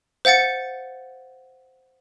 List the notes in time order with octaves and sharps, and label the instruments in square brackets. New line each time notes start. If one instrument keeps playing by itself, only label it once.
[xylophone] C5 F5 F#5 A6 C#7